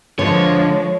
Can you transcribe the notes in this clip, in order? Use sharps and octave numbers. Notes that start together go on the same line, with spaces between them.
D3 F3 G#3 C#5